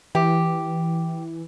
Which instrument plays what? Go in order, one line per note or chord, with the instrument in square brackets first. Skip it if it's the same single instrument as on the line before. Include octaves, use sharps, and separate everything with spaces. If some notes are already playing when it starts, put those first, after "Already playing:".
[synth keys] E3 [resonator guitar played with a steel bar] G4